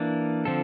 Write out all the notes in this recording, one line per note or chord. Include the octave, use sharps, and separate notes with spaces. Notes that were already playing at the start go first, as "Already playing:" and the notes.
Already playing: E3 A#3 D4
D3 F3 C4 F4 A4